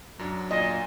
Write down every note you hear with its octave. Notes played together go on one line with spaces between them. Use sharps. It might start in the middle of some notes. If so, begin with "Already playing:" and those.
F#2 F#3 D4
A#2 D#5